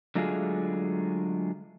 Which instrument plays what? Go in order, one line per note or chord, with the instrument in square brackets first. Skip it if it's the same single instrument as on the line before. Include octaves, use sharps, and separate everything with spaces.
[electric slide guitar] D3 F#3 G#3 A3 F4 G#4